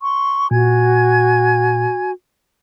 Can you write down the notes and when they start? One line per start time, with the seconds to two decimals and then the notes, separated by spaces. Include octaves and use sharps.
0.01 C6 C#6
0.51 A#2 F#4 G#5 G#6